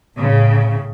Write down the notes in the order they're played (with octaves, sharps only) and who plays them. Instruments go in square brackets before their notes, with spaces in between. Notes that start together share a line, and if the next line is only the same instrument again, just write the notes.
[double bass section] A2 [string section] C#3